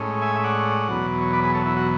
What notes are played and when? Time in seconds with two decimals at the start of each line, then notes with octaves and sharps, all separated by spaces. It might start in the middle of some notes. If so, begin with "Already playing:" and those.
Already playing: A2 G#3 C#4
0.22 E5 G#5
0.35 E5
0.44 D5 F#5
0.88 E2 B2 F#3
1.22 C#5
1.33 B4 D5
1.43 G#4 B4
1.55 A4 C#5
1.66 E4
1.77 F#4